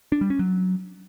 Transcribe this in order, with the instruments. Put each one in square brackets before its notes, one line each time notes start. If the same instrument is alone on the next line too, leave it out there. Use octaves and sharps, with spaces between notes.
[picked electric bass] D4
G3
C#4
F#3